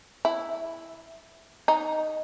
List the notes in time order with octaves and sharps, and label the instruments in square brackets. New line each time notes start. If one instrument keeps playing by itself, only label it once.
[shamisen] E4
D#4